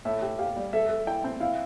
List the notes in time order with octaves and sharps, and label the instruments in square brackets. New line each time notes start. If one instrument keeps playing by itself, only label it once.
[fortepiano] A2 [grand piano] E5
[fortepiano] G4
[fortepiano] G4 [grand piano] F5
[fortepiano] G3
[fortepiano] A4 [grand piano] E5
[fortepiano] A4
[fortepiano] E4 [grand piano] G5
[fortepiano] C4
[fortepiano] E4 [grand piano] F5